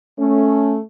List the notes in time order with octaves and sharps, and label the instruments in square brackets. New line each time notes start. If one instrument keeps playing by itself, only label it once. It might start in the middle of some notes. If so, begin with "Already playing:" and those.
[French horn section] A3 [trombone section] C#4